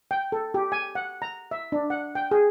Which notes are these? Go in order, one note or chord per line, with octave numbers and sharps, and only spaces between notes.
G5
A4
G4
G#5
F#5
A#5
E5
D4
F#5
G5
G#4